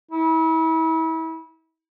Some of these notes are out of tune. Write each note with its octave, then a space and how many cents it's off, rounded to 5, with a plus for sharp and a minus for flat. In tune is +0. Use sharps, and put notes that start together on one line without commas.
E4 -35